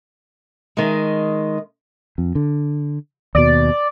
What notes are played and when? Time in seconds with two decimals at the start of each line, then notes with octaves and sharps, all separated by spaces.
0.77 D#3 G#3
2.18 F2
2.35 D3
3.35 D#2 B2 D5